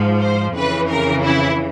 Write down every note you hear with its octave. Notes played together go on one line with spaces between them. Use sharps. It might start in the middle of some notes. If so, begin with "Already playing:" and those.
Already playing: G#2 F3
C5
F2 C#3 E3 B4
A#4
E4